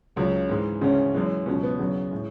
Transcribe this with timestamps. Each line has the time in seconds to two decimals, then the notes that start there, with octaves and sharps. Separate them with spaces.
0.16 C#2 C#3 F#3
0.49 G#2 E3 G#3
0.81 D2 C#3 E3 G#3 C#4
1.14 F#2 E3 G#3
1.46 C#2 B2 F#3 C#4
1.63 B3
1.79 E2 C#3 F#3
2.11 A2 G#3